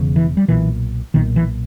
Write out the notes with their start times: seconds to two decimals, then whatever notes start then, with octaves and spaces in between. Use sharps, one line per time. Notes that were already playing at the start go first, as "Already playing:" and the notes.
Already playing: E1 E2 C#3
0.16 E3
0.37 G3
0.48 B1 A#2 E3
1.14 B1 A#2 D#3
1.36 E3